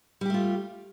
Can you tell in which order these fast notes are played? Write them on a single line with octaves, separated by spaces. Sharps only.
G3 G4 A3 F4